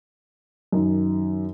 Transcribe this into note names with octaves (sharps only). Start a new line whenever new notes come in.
F#2 D#3 D#4